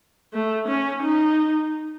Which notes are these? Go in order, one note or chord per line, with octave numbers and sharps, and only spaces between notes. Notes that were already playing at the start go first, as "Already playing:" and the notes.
A3
C#4
D#4